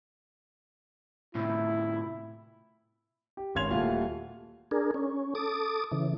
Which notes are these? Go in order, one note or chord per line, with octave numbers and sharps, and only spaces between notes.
A2 C3 E4
G4
G#1 C#4 C6 G#6 F7
D#1 G3 A3 F4 F#4 F5
D4 G#4 A#4
C#4
A4 D6 D#6
C#3 E3